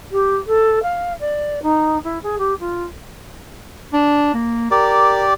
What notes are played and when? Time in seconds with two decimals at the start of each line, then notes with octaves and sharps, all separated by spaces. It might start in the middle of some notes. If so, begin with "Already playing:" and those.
0.11 G4
0.47 A4
0.83 F5
1.20 D5
1.62 D#4
2.04 E4
2.23 G#4
2.38 G4
2.60 F4
3.93 D4
4.34 A#3
4.71 G4 A#4 D5